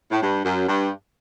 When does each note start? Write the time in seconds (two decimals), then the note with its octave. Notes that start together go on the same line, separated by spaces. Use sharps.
0.11 A2
0.22 G2
0.44 F#2
0.68 G2